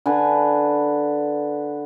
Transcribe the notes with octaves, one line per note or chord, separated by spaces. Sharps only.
D3 B4 G#5